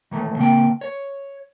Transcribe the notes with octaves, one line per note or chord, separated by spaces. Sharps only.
D#3 E3 A3
C#3 A#3 C4 G5
C#5